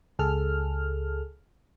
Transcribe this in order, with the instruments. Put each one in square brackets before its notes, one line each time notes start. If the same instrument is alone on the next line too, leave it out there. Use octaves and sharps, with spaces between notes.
[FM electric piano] C#2 G#4 A4 F6